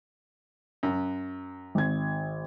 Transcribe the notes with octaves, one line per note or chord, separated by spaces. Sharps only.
F#2
G#1 G#6